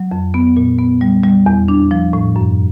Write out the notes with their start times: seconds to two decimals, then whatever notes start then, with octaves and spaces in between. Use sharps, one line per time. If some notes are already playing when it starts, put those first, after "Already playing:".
Already playing: F#3
0.12 F2
0.34 B3
0.57 A#2
0.79 B3
1.01 G3
1.24 G3
1.46 E2
1.68 D4
1.91 F3
2.13 A2
2.36 F#2